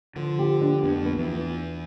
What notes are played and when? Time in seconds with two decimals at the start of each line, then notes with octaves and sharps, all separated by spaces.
0.16 D3 F3
0.39 G4
0.61 D4
0.83 F2 B3
1.06 B3
1.17 E2
1.27 F4